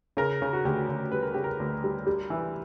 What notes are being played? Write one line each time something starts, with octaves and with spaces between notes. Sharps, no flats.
C#3 A#4
C#3
F#4
D2 G4
D2
G3 B4
A#4
C#3 G4
A#4
D2
G3
G3
E3